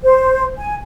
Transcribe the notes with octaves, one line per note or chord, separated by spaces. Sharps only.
C5
G#5